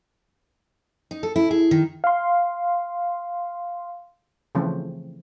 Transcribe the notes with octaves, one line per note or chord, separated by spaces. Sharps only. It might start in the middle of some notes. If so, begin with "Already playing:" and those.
D#4
A4
E4
G#4
D#3
F5 C6
C#3 E3 F3 A3 C4